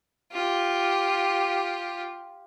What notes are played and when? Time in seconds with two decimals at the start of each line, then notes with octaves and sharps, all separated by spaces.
0.33 F4 G4